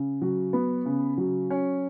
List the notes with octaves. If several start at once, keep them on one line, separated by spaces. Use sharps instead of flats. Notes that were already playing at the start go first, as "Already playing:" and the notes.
Already playing: C#3
F#3
B3
C#3
F#3
C#4